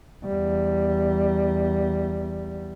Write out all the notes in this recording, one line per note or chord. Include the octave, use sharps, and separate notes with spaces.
E2 G3